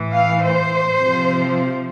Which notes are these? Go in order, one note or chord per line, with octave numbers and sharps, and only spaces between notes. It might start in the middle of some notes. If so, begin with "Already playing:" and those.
Already playing: A2 E3
F5
C5
C3 F3